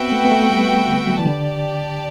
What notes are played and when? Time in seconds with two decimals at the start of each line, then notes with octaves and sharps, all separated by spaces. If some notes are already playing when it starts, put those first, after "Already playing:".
Already playing: B3 C4 F#4 B4 E5 G5
0.12 A3
0.25 B3
0.32 A3
0.50 G3
0.88 D3
1.07 F#3
1.19 E3
1.25 D3 G4 D5 A5